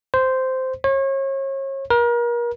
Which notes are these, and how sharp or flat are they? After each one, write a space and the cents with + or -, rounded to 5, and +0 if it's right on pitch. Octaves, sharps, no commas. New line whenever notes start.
C5 -10
C#5 -35
A#4 +35